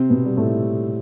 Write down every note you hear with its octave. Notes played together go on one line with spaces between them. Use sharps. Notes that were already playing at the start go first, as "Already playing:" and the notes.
Already playing: C3 C4
B2 B3
G3
A2 A3